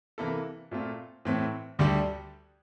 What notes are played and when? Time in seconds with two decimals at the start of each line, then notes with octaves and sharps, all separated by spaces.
0.18 C3 E3 A#3 E4 A4
0.71 A#2 A3 C4 F4
1.25 A2 E3 A3 C4
1.79 D2 D3 G3 D4 G4